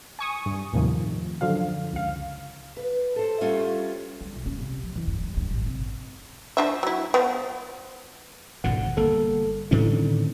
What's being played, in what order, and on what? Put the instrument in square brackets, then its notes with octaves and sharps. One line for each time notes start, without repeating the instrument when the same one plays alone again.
[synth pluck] G#5 C#6 D#6
G2
D#2 A2 C3 D#3 F3
F#2 D3 F3 F5
C#2 F5
[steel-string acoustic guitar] B4
A4 C5
G3 A3 C#4 F4
[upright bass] G3
B1
C#4
C3
F3
E3
G2
G3
G2
A1
C3
[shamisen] F3 D4 E5
F#3 E4
F3 B3
[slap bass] G#1 F2 D3 [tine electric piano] B2 F#5
[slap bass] G1 A#3 [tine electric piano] A4
[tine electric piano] A2 D3 [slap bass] D#3 C4 C#4